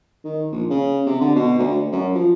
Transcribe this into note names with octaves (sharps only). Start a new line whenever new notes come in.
D#3
A#1
C#3
C3
D3
B2
D2
F#2
F3